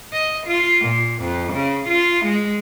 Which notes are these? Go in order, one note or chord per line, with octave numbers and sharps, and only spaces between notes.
D#5
F4
A#2
F2
C#3
F4
G#3